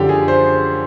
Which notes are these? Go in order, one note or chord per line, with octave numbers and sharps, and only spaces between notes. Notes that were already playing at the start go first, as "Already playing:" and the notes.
Already playing: F#2 D3 F3 G4
G#4
C5